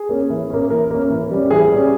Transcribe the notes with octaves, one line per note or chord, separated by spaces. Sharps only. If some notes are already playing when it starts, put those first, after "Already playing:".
Already playing: G#4
A#3 C#4
E3
A#3 C#4
E3 A#4
A#3 C#4
E3
G3 C#4
E3 G#4
G3 C#4